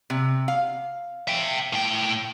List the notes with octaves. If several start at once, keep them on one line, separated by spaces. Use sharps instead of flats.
C3
F5
E5 G5
A2 G5